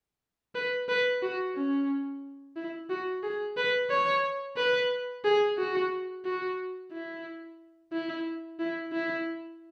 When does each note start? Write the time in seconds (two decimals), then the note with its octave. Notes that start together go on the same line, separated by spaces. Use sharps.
0.55 B4
0.89 B4
1.22 F#4
1.56 C#4
2.57 E4
2.90 F#4
3.23 G#4
3.57 B4
3.90 C#5
4.57 B4
5.25 G#4
5.58 F#4
6.25 F#4
6.92 E4
7.92 E4
8.59 E4
8.93 E4